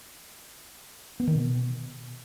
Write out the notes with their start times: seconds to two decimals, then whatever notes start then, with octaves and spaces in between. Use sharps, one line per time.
1.20 B3
1.27 D#3
1.35 B2